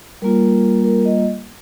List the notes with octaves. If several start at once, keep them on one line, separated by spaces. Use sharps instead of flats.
G3 A#3 F4 A#4
A#4
D#5